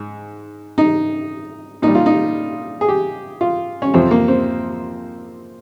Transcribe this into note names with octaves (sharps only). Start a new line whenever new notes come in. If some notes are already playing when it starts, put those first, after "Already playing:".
Already playing: G#2
D#4
A#2 G3 D#4
F4
D#4
G#4
G4
F4
C#4
F2 C3 F3 C4
A#3
C4